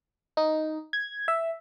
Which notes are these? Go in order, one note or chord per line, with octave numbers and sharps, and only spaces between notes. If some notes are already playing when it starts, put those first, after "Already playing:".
D#4
G#6
E5